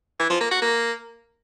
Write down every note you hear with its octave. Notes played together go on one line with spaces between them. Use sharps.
E3
F3
A#3
F#4
A#3